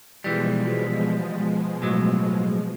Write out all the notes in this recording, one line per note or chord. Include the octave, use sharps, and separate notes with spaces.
B2 E3 F3 G3 G#3
A2 F#3